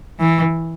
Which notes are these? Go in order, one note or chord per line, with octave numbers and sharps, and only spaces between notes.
E3